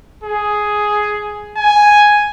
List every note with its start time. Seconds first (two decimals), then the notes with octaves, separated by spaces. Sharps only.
0.24 G#4
1.57 G#5